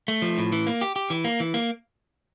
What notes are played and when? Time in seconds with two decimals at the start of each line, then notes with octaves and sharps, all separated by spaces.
0.08 A3
0.22 F3
0.38 A2
0.52 E3
0.67 A#3
0.81 G4
0.96 G4
1.10 E3
1.25 A#3
1.40 E3
1.54 A#3